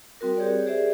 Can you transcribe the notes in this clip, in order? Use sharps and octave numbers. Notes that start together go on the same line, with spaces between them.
G3 C4 F#4 A#4
G4 G#4 C#5 D5
G4 G#4 C5 D5 E5